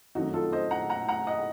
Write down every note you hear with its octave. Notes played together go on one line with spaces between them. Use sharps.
F#1 F2 D#3 F#3 A3 D#4 F#4
F4 A4
C5 D#5
F#5 A#5
F#5 A#5
F#5 A#5
D#5 F#5